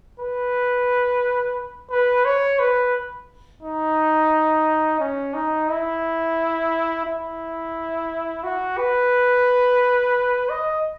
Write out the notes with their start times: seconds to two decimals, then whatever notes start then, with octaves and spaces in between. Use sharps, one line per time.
0.19 B4
1.91 B4
2.25 C#5
2.60 B4
3.63 D#4
5.00 C#4
5.34 D#4
5.69 E4
7.06 E4
8.44 F#4
8.77 B4
10.49 D#5